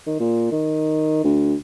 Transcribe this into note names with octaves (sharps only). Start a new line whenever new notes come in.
D#3
A#2
D#3
D2